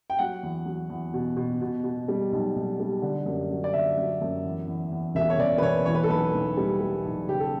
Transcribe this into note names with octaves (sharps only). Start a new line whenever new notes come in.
G5
F#3 F#5
E2
F#3
E2
B2
B2
B2
B2
G3
B1
B1
G3
D3
F#2
F#3
D5
D3 E5
F#3
F#2
E2
E2
E2
E1 E5
C#5
E1 D5
B4
E1 C#5
E3 C#5
B4
A4
B1 B4
B1
G3
G3
B1
C#3 G4
A4